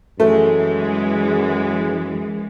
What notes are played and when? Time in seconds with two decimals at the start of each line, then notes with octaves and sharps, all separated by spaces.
0.20 F#2 E3 G#3 A3